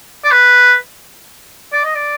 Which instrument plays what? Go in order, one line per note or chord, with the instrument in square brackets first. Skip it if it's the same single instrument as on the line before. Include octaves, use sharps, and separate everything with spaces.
[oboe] D5
B4
D5
D#5
D5